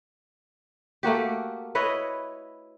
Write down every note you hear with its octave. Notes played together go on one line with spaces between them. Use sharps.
A3 A#3 F#4 G4
E4 B4 C#5 D#5